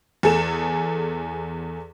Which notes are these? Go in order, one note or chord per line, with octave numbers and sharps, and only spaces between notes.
E2 G#4 A4 E7